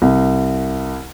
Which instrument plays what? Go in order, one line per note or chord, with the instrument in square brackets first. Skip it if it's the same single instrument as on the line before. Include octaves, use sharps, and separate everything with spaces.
[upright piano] C2